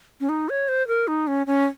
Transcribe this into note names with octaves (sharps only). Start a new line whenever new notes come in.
C#4
D#4
C#5
C5
A#4
D#4
C#4
C#4